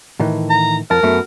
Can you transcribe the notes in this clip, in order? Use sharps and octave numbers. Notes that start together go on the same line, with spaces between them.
A2 D#3 E3
A#5
F2 A#4 A5
F#2 A3 B3